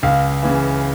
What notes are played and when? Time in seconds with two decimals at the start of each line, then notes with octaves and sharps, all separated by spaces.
0.03 C#2 F5
0.43 C#3 E3